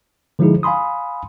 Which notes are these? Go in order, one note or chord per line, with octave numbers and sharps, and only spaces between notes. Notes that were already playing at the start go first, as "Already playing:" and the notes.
D3 F3 G#3 D#4 E4 G#4
F5 G#5 B5 C6 D#6